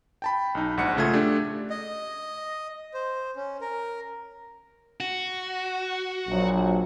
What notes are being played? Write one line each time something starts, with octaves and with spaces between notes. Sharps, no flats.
G5 A5 B5
B1 D#4
A#1 G#2 F#5 C#7
C#3 A3 F4 G#6
A3 D4 G4
D#5
C5
C#4
A#4
F#4
A#1 F#3